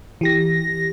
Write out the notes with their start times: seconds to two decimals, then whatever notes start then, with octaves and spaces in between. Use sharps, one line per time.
0.21 E3 G4 A#6